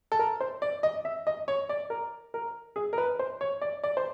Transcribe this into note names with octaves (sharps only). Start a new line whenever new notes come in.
A4
A#4
C5
D5
D#5
E5
D#5
C#5
D5
A#4
A#4
G#4
A#4
B4
C5
C#5
D5
D5
C5